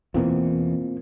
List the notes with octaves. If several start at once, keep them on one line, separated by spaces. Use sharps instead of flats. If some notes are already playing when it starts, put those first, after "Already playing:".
E2 B2 E3 A#3 C4 F4